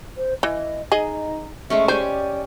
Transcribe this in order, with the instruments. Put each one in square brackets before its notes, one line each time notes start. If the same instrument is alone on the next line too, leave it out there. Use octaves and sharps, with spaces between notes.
[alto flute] C5
[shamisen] E3 [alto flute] D#5
[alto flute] D#4 [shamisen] G#4 D#5
[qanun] G#3 A3 C#4 [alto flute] E5
[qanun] G4 G#5 [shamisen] C5 [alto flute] D5